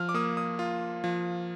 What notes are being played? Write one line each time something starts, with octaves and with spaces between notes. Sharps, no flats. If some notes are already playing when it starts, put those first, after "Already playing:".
Already playing: F3 F6
D6
A#3 D#6
D#6
F4
F3